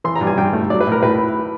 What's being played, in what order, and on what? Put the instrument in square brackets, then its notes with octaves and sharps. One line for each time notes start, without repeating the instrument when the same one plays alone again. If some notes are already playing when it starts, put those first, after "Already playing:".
[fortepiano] E3 C6
A#5
G2
G#5
G2 G5
A3
F#3 D5
B4
A2
A#4
A2 B4